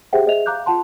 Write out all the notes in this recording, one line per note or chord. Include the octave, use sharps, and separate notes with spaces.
G4 G#4 C5 E5 F#5 G5
G#4 C5 D#5 E5 F7
F5 A#5 D6 F#6 G6
F4 F#5 A5 C6